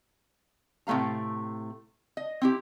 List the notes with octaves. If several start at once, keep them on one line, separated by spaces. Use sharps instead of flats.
A2 C3 A3 F5 A#5
D#5
C4 E4 G4